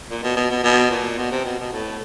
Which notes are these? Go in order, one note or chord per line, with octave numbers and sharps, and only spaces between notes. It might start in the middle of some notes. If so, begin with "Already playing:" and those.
A#2
B2
B2
B2
B2
A#2
B2
C3
B2
B2
A2